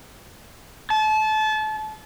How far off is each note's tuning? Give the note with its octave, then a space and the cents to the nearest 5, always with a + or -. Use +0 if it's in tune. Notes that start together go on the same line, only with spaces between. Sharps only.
A5 -30